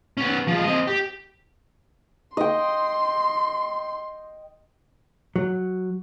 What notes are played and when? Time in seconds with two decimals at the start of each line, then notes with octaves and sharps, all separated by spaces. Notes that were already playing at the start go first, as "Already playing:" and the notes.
0.17 B3 C#4
0.47 F3 G#3
0.64 C4 D#5
0.87 G4
2.37 D#5 G5 C6
5.36 F#3